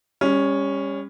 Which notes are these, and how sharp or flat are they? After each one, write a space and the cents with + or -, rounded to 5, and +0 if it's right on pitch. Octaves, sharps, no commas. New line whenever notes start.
G3 +35 C#4 +0